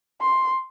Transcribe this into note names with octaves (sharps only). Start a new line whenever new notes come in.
C6